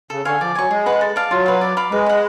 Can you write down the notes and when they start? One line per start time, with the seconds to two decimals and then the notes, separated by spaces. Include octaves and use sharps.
0.10 C#3 A4
0.25 D3 F5 G#5 C#6
0.41 F3 D5
0.55 F#3 G#5 C#6
0.70 G#3 G#4
0.86 B4 F#5
1.01 A4
1.16 D5 F5 A5
1.31 F#3 F4
1.46 B4 F5
1.61 D5
1.77 F5 B5 D6
1.92 G#3 B4
2.06 F#5 B5